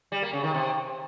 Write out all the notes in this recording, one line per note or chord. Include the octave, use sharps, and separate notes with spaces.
G3
A#3
C#3
D#3
C3